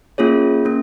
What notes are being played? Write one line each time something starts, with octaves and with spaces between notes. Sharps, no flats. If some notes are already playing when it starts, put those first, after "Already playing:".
A#3 C#4 F4 G#4 C#5
A#3 C#4